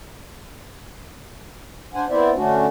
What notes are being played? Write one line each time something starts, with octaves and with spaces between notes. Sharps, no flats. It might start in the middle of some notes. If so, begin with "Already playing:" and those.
D4 C5 F#5 G#5
B3 C4 E4 C5 D5 E5
D3 A3 C#4 D4 F#4